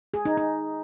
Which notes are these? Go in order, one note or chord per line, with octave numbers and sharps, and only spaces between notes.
G#4
D#4
D#4